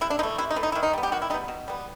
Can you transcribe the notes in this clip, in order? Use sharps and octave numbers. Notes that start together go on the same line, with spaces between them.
C3 E4
D4
E3 A3 D#4
C3 E4
D#4
E3 A3
D#4
D#3 E4
D#4
G3 B3
G4
D#3 F#4
E4
G3 B3 D#4
B2
G3 B3